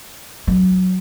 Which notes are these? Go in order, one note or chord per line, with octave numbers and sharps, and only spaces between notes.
F#3